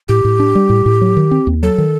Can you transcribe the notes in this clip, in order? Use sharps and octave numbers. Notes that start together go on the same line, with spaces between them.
A2 G4
A2
D4
G3
A2
A2
F#3
D#3
C4
D#2
F#3 A4
D#3